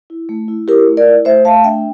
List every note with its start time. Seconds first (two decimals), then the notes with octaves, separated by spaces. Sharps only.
0.10 E4
0.29 A3
0.48 E4
0.68 E4 G4 A#4
0.87 A3
0.97 A#4 D5
1.07 E4
1.25 A3 C5 E5
1.45 A3 F5 A5
1.64 D4 E5 G5